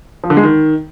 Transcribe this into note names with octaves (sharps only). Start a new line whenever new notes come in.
F3
D3
G#3
D#3